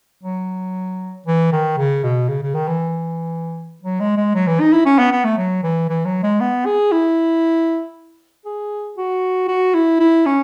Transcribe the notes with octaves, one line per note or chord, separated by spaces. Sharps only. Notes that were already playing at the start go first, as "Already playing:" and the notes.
F#3
E3
D#3
C#3
B2
C#3
C#3
D#3
E3
F#3
G#3
G#3
F#3
E3
D#4
E4
C#4
B3
B3
A3
F#3
E3
E3
F#3
G#3
B3
G#4
E4
G#4
F#4
F#4
E4
E4
C#4